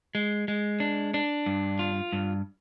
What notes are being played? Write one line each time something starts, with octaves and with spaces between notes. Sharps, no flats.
G#3
G#3
D4
D4
G2
F4
G2